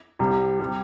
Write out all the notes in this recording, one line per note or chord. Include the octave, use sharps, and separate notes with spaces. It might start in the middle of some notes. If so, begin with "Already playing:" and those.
C2 C3 G3
C3 G3